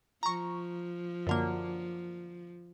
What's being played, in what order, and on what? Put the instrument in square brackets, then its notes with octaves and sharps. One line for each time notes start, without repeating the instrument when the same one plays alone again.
[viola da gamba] F3 [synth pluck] A#5 C#6
[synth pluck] F#2 D3 A#3